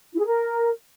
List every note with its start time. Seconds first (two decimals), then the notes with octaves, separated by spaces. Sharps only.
0.13 E4
0.19 G#4
0.26 A#4